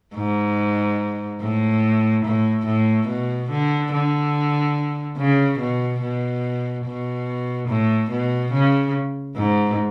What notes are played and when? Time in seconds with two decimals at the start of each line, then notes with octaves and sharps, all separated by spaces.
0.15 G#2
1.41 A2
2.25 A2
2.66 A2
3.07 B2
3.50 D3
3.92 D3
5.17 C#3
5.59 B2
6.01 B2
6.85 B2
7.68 A2
8.11 B2
8.52 C#3
9.36 G#2